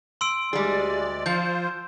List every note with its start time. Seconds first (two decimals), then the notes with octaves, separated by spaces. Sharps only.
0.21 C6 E6 D7
0.53 D2 G3 G#3 G#4 D5
1.26 F3 F4 C5 G6